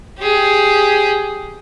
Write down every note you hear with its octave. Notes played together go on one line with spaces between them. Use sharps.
G4 G#4